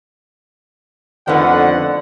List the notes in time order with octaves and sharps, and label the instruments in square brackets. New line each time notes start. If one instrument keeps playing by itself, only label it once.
[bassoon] F2 [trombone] D3 [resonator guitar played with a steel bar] D#3 A3 B3 [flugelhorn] F#5